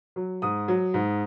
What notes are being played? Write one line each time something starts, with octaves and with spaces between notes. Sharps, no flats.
F#3
G#2 D#6
F#3
G#2